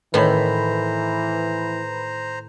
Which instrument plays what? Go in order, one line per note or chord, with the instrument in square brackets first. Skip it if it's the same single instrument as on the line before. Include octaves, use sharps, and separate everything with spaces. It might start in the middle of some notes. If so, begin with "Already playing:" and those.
[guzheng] A2 D#3 [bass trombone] E3 [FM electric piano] B4 B5 [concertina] C5 A#5